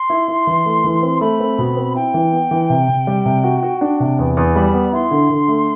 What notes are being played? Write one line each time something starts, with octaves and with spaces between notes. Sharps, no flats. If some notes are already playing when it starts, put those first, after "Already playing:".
Already playing: C6
E4
E4
E3
A3
E3
C4
A3 B5
C4
B2
C4
E4 G5
E3
B3
E3
C3
C3
G3
C3
F#4
F#4
D4
C3
E2
E2
G3 B5
B3
E4 C6
D3
D3
A3